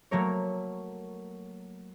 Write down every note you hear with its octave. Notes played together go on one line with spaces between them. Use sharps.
F#3 A3 A#3 A#4 C#5